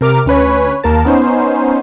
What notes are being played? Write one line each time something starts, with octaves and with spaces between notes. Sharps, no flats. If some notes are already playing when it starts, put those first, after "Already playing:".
C3 A#4 D6 F6
D2 C#4 B4 C#5
D#2 A#3 A#4 A5
B3 C#4 D#4 C5